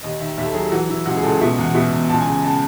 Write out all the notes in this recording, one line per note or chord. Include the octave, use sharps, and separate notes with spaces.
D#2 D#5
D#3 E5
D#2 E5
A4
F#3 G#4
E3 F#4
E3 E4
C#2 F#4
G#4
C#2 A4
B2 E5
E2 F#5
B2 E5
E2
C#2 A5
G#5
C#3
G#5
C#3 A5